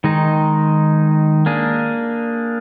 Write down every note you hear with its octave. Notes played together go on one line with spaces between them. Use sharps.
D#3 G#3 D#4
A#3 D4 G#4